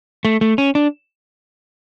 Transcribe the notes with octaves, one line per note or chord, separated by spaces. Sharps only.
A3
A3
C#4
D4